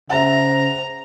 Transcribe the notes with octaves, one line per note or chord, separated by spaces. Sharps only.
C#3 C5 E5 F#5 A#5